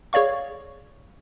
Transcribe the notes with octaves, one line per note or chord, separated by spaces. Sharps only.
G#4 C#5 D5 F5 C#6